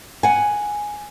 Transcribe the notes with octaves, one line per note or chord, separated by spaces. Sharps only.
F#5 G#5